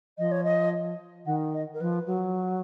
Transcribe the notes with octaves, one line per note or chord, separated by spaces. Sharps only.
F3 D#5
C#5
D#5
D#3 F#5
D#5
A#4
F3 B4
F#3